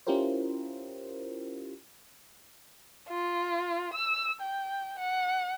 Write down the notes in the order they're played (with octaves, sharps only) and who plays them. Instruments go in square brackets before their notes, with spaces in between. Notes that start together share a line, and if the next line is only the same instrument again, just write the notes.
[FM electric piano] C#4 E4 F4 G4 A#4 C5
[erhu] F4
E6
G5
F#5